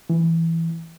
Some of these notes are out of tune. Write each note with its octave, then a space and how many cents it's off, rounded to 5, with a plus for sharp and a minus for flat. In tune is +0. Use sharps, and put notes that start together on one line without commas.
E3 +0